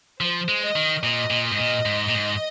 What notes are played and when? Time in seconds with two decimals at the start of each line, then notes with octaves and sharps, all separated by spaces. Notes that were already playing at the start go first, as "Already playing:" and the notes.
0.21 F3 C5
0.48 G#3
0.62 D#5
0.76 D#3
1.03 A#2 D#5
1.31 A#2
1.51 G#2
1.58 A#2
1.86 G#2
2.09 A#2
2.14 G#2